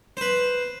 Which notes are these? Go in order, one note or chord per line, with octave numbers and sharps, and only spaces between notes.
B4 C5